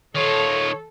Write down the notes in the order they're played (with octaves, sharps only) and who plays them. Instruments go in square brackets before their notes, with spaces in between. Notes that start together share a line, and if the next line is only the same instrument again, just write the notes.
[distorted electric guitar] D#3 F4 [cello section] A4 [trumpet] C#5